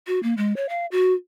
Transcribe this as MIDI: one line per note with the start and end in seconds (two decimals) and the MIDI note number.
0.07 0.22 66
0.23 0.34 58
0.37 0.55 56
0.56 0.69 73
0.69 0.86 77
0.92 1.14 66